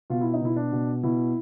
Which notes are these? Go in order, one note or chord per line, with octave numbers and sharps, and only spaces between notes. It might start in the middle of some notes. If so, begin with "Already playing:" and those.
B2 F4
E4
D#4
B2 E4
D4
B2
B2 E4